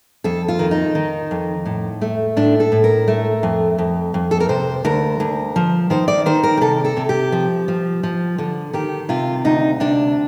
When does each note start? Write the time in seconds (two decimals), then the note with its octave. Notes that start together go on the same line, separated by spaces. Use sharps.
0.24 F2 A4
0.48 F4
0.59 D#3
0.71 D#4
0.95 D#3
1.31 F2
1.66 A2
2.01 A3
2.36 A2 D4
2.60 A4
2.72 A2
2.84 A#4
3.08 A3
3.43 F2
3.78 F2
4.14 F2
4.31 A4
4.40 A#4
4.49 C3 C5
4.85 D2 A#4
5.20 D2
5.56 F3
5.90 D#3 C5
6.08 D5
6.26 D#3 C5
6.43 A#4
6.57 G4
6.61 C3 A4
6.85 A4
6.97 C3
7.09 G4
7.32 F3
7.68 F3
8.03 F3
8.38 D3
8.73 D#3 G4
9.09 C3 F4
9.45 D2 D#4
9.80 C3 D4